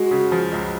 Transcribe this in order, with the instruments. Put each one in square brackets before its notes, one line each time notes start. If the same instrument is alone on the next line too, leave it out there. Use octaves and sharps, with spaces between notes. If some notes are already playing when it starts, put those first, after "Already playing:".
Already playing: [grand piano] G#3 [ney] F#4
[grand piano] C#3
F3
C#2